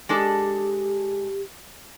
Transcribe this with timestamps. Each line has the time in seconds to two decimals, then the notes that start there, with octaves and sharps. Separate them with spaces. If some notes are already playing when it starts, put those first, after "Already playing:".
0.09 G#3 D4 G4 A4